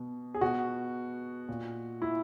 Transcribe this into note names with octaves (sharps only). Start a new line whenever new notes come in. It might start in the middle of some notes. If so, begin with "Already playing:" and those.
Already playing: B2
G#4
B2 F#4
A#2
E4